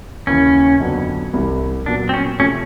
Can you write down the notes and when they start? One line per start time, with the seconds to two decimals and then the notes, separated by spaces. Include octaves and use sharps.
0.27 D#2 C#3 E3 C#4
0.80 F2 D3 F#3 B3 D4
1.33 C2 C3 E3 G3
1.86 A#2 F#3 B3 D4
2.09 C4
2.14 C#4
2.40 C3 F3 A3 C#4